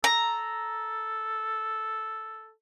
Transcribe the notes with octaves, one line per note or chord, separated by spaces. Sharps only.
A4 A#5